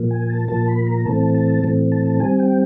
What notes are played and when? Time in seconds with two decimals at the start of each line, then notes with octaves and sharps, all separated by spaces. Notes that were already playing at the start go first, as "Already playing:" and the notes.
Already playing: A#2 F3 A#3
0.11 G#5
0.30 A5
0.48 A#2 F3 A#3 A5
0.68 B5
0.87 A#5
1.06 A2 E3 A3 C4 A5
1.34 A5
1.64 A2 E3 A3 C4
1.92 A5
2.20 D#3 G3 C4 G#5
2.39 G5